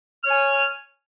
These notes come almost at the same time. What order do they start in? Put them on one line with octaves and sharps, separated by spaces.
F6 C#5 G#5